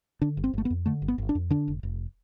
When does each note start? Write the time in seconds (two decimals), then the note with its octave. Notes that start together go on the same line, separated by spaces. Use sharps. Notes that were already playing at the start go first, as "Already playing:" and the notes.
0.22 D3 D4
0.37 G1
0.44 C4
0.53 G1 A3
0.65 B3
0.70 F2
0.86 D3 A3
1.02 G1
1.08 B3
1.18 G1
1.29 D4
1.35 F2
1.50 D3 D4
1.68 F1
1.83 F1